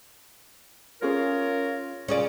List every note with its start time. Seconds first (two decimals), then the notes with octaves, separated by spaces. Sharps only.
1.02 C#4 F4 G#4 A#4 C5 C#5
2.08 A#2 C#3 C#4 G#4 D5